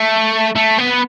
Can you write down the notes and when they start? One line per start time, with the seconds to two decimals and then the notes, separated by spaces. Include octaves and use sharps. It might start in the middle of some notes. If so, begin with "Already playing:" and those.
Already playing: A3
0.56 A3
0.79 B3